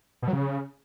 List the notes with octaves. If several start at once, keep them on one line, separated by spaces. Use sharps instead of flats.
B2
F#3
C#3